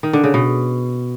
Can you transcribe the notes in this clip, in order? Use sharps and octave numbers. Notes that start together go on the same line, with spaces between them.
D#3
D3
C#3
B2